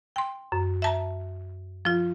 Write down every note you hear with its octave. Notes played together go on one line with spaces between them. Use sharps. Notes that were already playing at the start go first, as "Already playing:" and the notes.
G5 C6
F#2
E5 A5 A#5
F3 F4